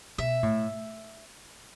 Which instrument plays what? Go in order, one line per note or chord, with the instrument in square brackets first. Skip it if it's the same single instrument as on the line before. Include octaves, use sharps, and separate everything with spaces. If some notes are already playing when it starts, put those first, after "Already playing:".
[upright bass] B2 [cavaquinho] E5
[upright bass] A2